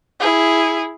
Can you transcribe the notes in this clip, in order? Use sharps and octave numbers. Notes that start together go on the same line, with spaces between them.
E4 G#4